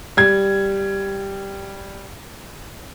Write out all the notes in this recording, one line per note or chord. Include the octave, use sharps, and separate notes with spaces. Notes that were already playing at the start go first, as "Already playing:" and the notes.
G3 G#6